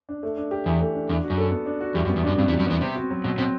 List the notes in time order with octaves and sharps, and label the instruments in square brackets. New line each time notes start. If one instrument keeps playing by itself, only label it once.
[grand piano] D4
A3
D4
G4
[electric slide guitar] E2 [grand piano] E3
[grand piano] A3
D4
[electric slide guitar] E2 [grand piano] D4
[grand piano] F#4
[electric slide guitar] F#2
[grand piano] A4
B3
D4
F#4
[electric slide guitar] E2 [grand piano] G3
[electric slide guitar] F#2
[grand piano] B3
[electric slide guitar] E2
[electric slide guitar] F#2 [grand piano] D4
[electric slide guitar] G2 [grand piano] C3
[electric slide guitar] E2 E3
[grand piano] G3
[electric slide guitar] F#2 F#3
[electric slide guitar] E2 E3 [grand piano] B3
[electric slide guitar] C3 [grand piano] C4
[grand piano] F#4
F#3
[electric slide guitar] B2 [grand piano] F#3
[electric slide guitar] B2 [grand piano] C4